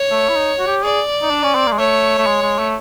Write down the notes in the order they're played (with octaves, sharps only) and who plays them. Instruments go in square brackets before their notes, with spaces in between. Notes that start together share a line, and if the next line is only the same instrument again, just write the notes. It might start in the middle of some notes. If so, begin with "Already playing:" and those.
Already playing: [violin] C#5
[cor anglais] A3
E4
D#4
F#4
G4
[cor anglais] G#4 [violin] D5
[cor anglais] D#4
D4
C#4
C4
A#3
G#3
[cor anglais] A3 [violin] C#5
[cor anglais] A3
G#3
G#3
A3